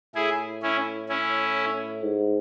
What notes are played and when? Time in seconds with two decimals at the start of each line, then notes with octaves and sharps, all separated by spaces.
0.15 A2 E4 G#4
0.62 C#4 E4
1.09 C#4 E4
2.03 G#2